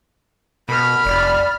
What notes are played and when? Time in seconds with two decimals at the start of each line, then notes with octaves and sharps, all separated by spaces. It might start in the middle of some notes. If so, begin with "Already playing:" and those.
0.69 B2 A#4 B5 F6
1.05 F1 D5